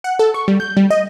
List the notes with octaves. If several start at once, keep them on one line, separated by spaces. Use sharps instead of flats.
F#5
A4
C#6
G3
G6
G3
D#5